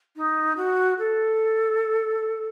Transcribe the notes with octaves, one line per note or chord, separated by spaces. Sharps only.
D#4
F#4
A4